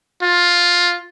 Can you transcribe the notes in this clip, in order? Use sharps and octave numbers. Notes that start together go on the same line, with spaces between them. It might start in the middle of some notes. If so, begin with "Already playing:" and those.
F4